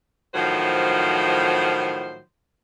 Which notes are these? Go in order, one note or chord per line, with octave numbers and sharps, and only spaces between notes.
A2 D#3 F3 F#3 C5